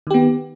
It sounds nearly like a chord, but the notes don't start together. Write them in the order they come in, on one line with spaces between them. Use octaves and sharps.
D#3 G4 B3